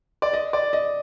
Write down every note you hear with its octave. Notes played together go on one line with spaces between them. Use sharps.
D5
D#5
D5
D#5